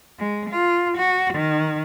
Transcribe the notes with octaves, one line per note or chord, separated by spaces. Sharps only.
G#3
F4
F#4
D#3